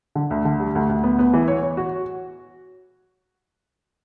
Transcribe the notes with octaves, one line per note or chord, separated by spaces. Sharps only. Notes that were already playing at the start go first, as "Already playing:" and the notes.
D3
D2
D3
G3
D2
D2
B3
B3
E3
C#5
C#5
F#4